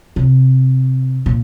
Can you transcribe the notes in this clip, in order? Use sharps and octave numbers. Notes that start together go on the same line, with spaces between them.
C3
A#2